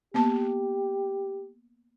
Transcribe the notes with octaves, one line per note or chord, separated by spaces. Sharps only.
A#3 B3 G4 A5